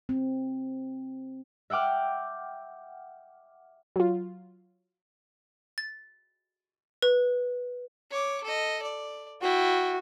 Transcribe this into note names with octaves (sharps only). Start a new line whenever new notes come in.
C4
E5 F#5 G5 D6 F6
F#3 F4
A6
B4
C#5 D6
A4 D#5
D5
E4 F#4 G5